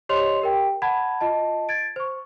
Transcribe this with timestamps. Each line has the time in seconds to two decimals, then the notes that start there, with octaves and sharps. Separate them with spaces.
0.09 G4 C5 C#5 D#5 C6 F7
0.42 G4 A#4 G5
0.82 F#5 A5 B5 G#6
1.21 F4 D#5 A5
1.69 G#6 A6 D7
1.96 C5 C#6